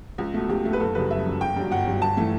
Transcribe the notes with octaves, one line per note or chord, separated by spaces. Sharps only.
C#2
B2 A3
C#2 G4
B2 A3
B4
F#1 A4
F#2 C#3 G3 B4
F#1 E5
F#2 C#3 G3
G1 G5
G2 F#3
G1 F#5
G2 F#3
G1 A5
E3 A3